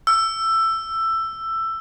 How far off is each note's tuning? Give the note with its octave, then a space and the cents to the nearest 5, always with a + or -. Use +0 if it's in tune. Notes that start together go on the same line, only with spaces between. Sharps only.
E6 +15